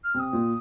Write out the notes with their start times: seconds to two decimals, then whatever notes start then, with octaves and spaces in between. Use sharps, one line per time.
0.04 F6
0.15 C3 F6
0.19 D#6
0.33 A#2